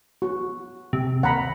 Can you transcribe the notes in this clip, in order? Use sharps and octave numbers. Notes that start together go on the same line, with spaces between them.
F#4
C3
D#2 F#5 A#5 B5